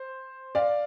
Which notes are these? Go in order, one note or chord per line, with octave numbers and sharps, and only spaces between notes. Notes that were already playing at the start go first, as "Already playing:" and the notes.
Already playing: C5
D5 F5